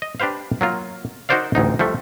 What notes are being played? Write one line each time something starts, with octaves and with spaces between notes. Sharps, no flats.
D#5
D4 G4 B4 C5 F5
F#3 A#3 F4
D#4 F#4 A#4 C5 D5 F5
A1 D2 D#4
F3 G3 A3